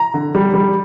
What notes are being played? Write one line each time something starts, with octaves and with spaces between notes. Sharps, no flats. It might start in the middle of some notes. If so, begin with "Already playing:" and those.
Already playing: A#5
D3
G3
G3